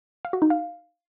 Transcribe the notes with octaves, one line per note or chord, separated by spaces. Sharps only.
F5
F#4
D#4
F5